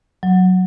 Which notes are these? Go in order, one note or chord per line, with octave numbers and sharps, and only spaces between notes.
F#3